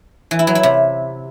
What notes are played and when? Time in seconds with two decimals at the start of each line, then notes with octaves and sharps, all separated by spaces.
0.31 E3
0.39 E4
0.47 F#3
0.55 E4
0.63 C3